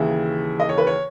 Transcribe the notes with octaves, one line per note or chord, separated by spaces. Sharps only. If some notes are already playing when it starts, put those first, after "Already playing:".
Already playing: D#2 C#3 E3 E5
D#5
C#5
B4
C#5